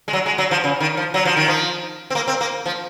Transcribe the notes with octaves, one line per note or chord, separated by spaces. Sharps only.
G#3
F#3
G#3
F#3
F3
C#3
D#3
F3
F#3
F3
D#3
F3
C4
A#3
C4
A#3
F3